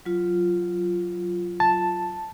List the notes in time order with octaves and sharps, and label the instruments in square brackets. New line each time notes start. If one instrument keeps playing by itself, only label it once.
[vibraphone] F#3 F4
[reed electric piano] A5